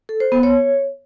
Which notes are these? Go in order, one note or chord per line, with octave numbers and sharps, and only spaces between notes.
A4
C5
B3
C#5